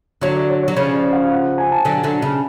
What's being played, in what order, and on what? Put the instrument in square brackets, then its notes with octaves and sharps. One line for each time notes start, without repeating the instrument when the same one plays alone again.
[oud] D3 F#3 [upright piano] C#5
[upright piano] D5
C#5
C#5
[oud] F#3
[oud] C#3 F3 [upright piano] C#5
[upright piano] D5
F5
F#5
G#5
A5
[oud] D3 F#3
D3 F#3
C#3